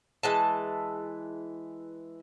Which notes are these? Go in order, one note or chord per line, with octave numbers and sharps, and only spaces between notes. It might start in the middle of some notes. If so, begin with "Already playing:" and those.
E3 G#3 A5